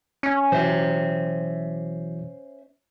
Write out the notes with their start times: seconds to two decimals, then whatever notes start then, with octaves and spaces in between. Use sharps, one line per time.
0.23 C#4
0.52 B2 E3 F#3 C5 E5